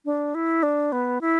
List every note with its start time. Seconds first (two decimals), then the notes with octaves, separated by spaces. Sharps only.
0.05 D4
0.35 E4
0.63 D4
0.92 B3
1.21 E4